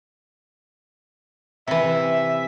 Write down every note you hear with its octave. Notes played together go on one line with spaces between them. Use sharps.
C3 E3 E5